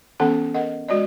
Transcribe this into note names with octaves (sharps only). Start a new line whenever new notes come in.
E3 B3 C#4 A4 F#5 A5
A#4 D#5 F#5
G#3 F#4 D5 D#5